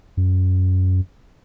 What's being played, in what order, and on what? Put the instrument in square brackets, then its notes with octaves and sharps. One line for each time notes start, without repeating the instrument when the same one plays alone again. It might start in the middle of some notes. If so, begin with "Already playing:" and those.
[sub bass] F#2